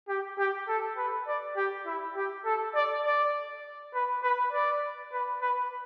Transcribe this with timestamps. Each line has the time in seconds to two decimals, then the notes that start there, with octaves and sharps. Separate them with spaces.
0.08 G4
0.38 G4
0.68 A4
0.97 B4
1.27 D5
1.56 G4
1.86 E4
2.16 G4
2.45 A4
2.75 D5
3.05 D5
3.94 B4
4.23 B4
4.52 D5
5.12 B4
5.41 B4